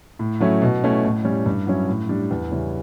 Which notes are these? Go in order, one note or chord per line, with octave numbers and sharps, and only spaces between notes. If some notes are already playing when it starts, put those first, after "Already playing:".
A2
F#3 A3 C#4 E4
B2
A3 C#4 E4
A2
G3 C#4
G2
F#3 C#4 E4
A2
G3 D4
E2
C#3 G3 C#4 E4